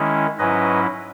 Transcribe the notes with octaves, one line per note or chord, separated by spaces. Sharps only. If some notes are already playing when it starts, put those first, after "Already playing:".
Already playing: D#3 G#3 C#4 E4
G#2 F#3 C#4 E4 B4 D#5